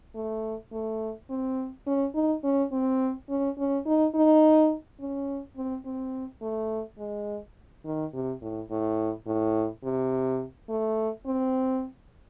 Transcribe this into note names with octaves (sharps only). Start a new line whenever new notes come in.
A3
A3
C4
C#4
D#4
C#4
C4
C#4
C#4
D#4
D#4
C#4
C4
C4
A3
G#3
D#3
C3
A2
A2
A2
C3
A3
C4